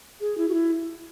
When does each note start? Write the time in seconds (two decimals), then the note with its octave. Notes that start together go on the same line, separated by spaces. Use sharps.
0.21 G#4
0.38 E4
0.48 F#4
0.54 E4